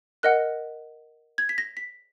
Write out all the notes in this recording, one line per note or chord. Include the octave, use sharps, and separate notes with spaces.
A#4 D#5 F#5 F#6
G#6
B6
A#6
B6